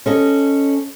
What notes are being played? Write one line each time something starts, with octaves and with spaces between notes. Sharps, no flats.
C#4 A4 D#5